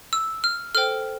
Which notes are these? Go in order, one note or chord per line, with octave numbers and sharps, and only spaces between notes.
E6
F6
A4 C5 G5 F6